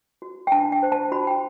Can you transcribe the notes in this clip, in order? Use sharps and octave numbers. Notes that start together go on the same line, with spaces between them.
F#4
G5
D4 A5
G5
C5
A5
F#4 B5
G5